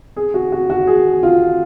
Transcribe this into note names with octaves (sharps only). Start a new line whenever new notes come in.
G#4
F#4
F#4
F#4
G#4
F4